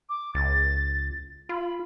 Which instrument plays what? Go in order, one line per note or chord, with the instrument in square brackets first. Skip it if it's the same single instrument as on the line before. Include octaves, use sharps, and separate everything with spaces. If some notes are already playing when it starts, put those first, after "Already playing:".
[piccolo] D6
[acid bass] C#2 [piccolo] A6
[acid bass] F4 [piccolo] B5